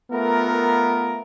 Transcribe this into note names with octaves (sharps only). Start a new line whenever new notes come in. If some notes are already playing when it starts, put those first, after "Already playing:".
A3 B3 F4 A#4